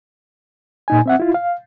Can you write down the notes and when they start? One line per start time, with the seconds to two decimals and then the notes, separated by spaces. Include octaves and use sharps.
0.88 A#2 D#4 G#5
1.06 C4 E5 F#5
1.20 E4 F4
1.34 F5